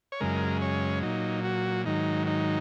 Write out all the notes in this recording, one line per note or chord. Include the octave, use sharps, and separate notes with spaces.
C#5
F#2 C#3 G#3 A#4
C#5
A#2 F#3 D#4
F#4
G#2 D#3 F#3 D#4
D#4